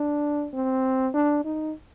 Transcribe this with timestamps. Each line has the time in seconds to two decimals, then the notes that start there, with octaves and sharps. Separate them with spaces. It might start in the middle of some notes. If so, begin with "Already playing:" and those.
Already playing: D4
0.54 C4
1.14 D4
1.45 D#4